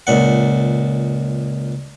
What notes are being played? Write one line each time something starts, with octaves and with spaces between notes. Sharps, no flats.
C#2 A#2 F#5